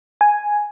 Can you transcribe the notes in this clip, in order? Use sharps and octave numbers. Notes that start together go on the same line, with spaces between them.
G#5